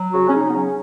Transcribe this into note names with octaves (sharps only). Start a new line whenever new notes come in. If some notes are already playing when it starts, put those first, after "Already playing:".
Already playing: F#3
C#3 F#4
C#4
C#3 D#4
B3
F#3 C#4